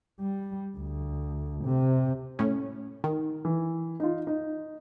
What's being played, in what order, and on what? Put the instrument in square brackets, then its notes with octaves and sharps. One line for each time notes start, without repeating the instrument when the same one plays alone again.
[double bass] G3
D2
C3
[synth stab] A2 C#4
D#3
[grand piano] E3
D#4 F4
D#4